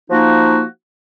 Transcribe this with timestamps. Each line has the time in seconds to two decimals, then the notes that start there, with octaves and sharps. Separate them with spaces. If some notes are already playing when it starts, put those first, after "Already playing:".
0.10 F3 A#3 D#4 F#4